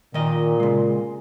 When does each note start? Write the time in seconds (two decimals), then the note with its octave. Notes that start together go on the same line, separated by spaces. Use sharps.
0.14 A#2 D#3 D#5
0.60 C#3 G#3